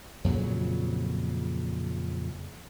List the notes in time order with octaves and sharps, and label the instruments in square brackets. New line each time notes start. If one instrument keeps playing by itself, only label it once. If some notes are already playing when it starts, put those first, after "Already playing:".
[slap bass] F2 A#2 C#3 F#3